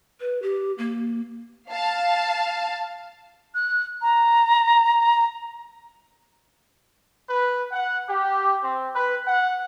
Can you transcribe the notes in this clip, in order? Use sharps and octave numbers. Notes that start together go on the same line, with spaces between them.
B4
G4
A#3
F5 A5
F#6
A#5
B4
F#5
G4
C4
B4
F#5